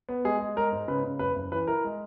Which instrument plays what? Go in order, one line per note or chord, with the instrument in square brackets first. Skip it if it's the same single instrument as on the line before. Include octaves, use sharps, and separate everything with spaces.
[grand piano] B3
G#3 G#4
G#3
G#3 A#4
G#2
C#3 B4
C#3
F#1 B4
F#1
E3 B4
E4 A#4
G#3